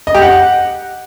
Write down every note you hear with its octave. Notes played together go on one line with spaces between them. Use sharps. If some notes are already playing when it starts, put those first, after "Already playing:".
D#5
G4
F#5